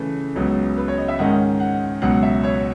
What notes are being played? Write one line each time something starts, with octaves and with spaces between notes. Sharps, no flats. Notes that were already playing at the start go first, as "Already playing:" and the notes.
Already playing: C#3 E3 A3
C#2 C#3 F#3 B3
B4
C#5
D#5
E5
G#2 D#3 G#3 C#4 F#5
F#5
C#2 B2 F#3 F#5
E5
C#5